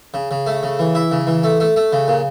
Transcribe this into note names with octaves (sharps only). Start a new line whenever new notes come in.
C#3
C#3
A3
C#3
E3
E4
C#3
E3
A3
A3
A3
C#3
A#2